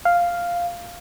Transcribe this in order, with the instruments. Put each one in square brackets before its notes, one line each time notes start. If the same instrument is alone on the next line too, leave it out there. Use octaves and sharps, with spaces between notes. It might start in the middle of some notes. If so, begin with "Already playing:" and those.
[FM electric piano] F5